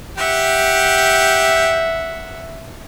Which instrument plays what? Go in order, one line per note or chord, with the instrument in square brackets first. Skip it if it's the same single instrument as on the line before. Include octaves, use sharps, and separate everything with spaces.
[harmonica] G4 G5 [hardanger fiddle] E5 F#5